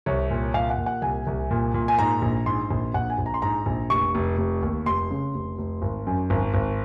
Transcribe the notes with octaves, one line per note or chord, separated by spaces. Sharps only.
C2 C#5
A#2
A#2 F5
F#5
A#2
F#5
C2 G#5
C2
A#2
A#2
G#5
G#2 A#5
A#1
G#2 C6
A#1
A#1 F#5
G#5
A#1
A#5
C6
G#2 A#5
A#1
F1 C#6
F1
F1
D#2
F1 C6
C#3
F1
F1
G#1
F#2
G#1
G#1